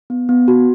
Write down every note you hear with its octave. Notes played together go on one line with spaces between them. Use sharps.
B3
B3
F#4